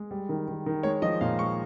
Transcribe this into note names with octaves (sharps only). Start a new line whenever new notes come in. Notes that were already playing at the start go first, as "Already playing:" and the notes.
Already playing: G#3
G3
D#3
D#3
D#3
G#3 C#5
F3 D#5
A#2 F5
G#3 C#6